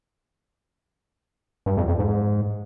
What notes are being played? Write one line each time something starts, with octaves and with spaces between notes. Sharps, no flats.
G2
F2
F2
G#2